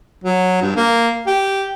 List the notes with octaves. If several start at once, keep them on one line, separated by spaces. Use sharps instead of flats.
F#3
G2
A#3
G4